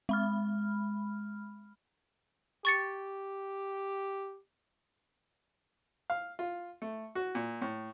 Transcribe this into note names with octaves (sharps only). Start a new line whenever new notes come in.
G#3 B5 F6
G4 C#6 A6 C#7
F5
F4
A3
F#4
A#2
A2